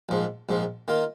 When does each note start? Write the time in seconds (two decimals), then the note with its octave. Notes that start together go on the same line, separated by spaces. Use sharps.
0.09 A#1 G#2 F3
0.49 A#1 G#2 F3
0.88 D#3 A#3 F4